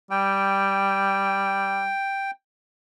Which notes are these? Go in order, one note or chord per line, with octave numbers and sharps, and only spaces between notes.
G3 G5